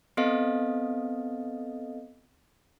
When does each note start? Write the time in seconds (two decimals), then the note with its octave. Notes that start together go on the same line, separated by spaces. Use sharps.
0.17 B3 C4 A4 D#5 F5